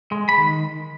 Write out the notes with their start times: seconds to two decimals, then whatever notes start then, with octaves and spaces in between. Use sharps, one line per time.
0.12 G#3
0.29 B5
0.37 D#3